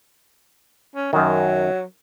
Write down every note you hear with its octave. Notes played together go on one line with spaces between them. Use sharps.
C#4
F#2 D#3 F#3